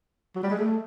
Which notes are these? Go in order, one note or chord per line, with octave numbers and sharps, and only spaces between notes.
F#3
G3
G#3
A3